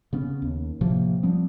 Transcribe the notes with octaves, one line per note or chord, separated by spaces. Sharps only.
C#3 B3 C#4
D#2
A2 C3 F3 A#3
F3 G3 B3 C4